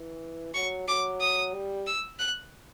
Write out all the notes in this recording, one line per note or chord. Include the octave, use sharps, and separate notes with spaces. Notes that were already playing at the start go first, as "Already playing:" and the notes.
Already playing: E3
F#3 C#6
F#3 D6
D#6
G3
E6
F#6